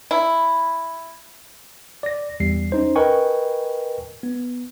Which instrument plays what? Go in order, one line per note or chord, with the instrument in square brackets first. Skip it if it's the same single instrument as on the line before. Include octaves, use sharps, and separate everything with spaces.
[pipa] E4
[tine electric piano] D5 A#6
E2 G3 C7
C#4 D#4 C5
A#4 B4 D#5 G5 G#5 C#6
B3